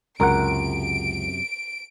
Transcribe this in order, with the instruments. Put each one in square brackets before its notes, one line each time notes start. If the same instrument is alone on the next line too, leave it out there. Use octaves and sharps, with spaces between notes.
[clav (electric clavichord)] C#2 F#5 [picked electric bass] F#2 C3 [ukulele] A#4 [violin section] D7